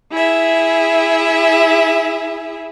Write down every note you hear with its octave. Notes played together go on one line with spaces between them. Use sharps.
E4 G#4 E5